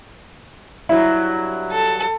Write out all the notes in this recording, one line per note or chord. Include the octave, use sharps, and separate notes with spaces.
G2 F#3 E4
A4